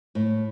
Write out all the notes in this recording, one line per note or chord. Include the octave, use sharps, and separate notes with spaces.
A2